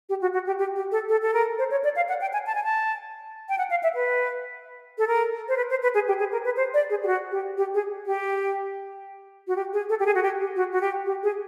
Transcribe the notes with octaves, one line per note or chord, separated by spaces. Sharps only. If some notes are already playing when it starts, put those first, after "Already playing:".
G4
F#4
F#4
G4
G4
G4
A4
A4
A4
A#4
C5
C#5
D5
F5
F#5
G5
G#5
A5
G#5
A5
G5
F#5
F5
E5
B4
A4
A#4
C5
B4
C5
B4
G#4
G4
G#4
A#4
B4
C5
D5
G#4
G4
F#4
G4
G4
G#4
G4
F#4
G4
G#4
A4
G4
G#4
F#4
G4
G4
F#4
F#4
G4
G4
G#4